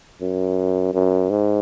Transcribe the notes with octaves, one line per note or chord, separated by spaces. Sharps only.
F#2
F#2
G#2